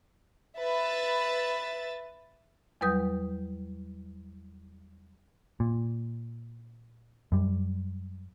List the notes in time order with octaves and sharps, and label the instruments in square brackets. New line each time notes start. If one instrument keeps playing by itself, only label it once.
[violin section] B4 E5 A6
[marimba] E2 F#3 G3 B4 D#6 G6
[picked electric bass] A#2
F#2 G3